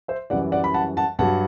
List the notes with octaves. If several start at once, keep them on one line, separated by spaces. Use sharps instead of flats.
C5 E5
F#2 E3 G3 D5 F#5
D5 F#5
B5
F#5 A5
F#5 A5
G2 F#3 F#5 A5